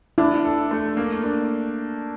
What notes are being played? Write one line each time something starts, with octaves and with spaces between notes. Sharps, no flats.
D4 E4
A4
A3
A#3
D4